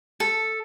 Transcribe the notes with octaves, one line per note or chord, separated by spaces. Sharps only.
A4